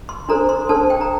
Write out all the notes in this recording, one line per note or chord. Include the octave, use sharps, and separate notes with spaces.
C6
D4 A4 C5 A#5
C6
D4 A4 C5 A5
G5
A#5